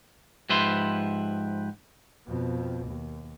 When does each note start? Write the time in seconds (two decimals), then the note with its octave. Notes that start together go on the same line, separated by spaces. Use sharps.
0.49 G#2 F3 G4 B4 E5 C6
2.27 F2 B2
2.87 D#2